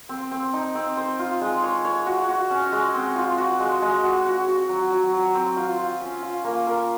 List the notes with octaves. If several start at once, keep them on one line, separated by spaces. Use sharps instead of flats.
C4
C4
D#4
C4
C5
F4
G#3
C#5
C#5
F#4
F#4
C#4
G#3
C4
F4
F#4
G#3
G#3
F#4
F#4
F#4
F#3
F#3
F#3
C4
F4
F4
C#4
F4
A#3
A#4